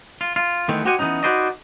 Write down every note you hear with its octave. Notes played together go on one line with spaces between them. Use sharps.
F4
F4
D#3 E3 A3 B3 C4
F#4 G4 C5 D#5 F#5 G#5
E3 F#3 B3 C#4 D#4
D#4 F#4 B4 C5 D5 D#5